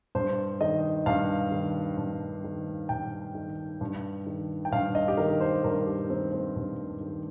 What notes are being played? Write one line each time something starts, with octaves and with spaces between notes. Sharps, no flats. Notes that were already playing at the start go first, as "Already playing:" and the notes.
G2 C5
D#3 D#5
G2 F5
D#3
G2
D#3
G2 G5
D#3
G2
D#3
G5
G2 F5
D#5
G4
D#3 A#4
C5
G2 A#4
G4
D#3 C4
C4
G2
D#3